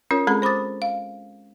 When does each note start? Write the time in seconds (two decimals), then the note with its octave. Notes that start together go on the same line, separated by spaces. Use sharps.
0.11 C#4 F4 A#4 C#5
0.27 G#3 C4 G#4 A4 A#5 B5
0.42 C5 B5 D6 D#6 A6
0.82 F5